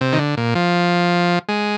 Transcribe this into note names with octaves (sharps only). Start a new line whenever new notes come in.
C3
D#3
D3
A#2
F3
G#3